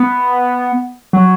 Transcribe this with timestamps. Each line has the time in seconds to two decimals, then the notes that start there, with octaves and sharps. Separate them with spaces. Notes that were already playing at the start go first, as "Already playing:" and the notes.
Already playing: B3
1.13 F#3